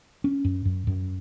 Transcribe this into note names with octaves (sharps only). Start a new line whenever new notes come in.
C#4
F#2
F#2
F#2